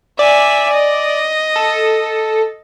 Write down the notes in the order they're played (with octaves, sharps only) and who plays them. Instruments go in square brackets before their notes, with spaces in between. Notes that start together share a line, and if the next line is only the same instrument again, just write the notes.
[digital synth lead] D5 [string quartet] E5 G#5
[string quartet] D#5
[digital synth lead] A4